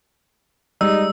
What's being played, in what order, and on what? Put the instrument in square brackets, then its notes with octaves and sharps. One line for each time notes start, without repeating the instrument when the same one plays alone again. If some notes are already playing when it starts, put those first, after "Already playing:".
[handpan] G3 G#3 [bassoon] D#4 [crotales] E6